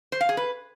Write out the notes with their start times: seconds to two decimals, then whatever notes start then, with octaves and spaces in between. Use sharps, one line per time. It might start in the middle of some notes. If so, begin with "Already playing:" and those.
0.12 C5
0.21 F5
0.29 G#4
0.37 B4